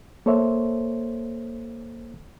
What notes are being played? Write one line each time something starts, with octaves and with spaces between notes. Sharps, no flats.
A#3 A4 C5 C#5 E5